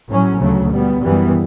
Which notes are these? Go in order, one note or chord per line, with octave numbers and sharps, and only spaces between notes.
A2 F#3 C#4
D2 C#3 F#3 A3
B2 G3 B3
F#2 E3 G3 B3